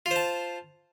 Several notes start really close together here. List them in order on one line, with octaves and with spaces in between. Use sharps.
F4 C5 A5